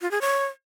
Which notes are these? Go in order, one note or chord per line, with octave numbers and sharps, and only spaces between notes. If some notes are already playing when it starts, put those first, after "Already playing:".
F4
G#4
C#5